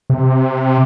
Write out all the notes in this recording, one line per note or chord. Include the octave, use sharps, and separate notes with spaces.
C3